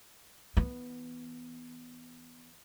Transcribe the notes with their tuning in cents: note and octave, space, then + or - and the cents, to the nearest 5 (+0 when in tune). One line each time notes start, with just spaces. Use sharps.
E3 -30 B3 +0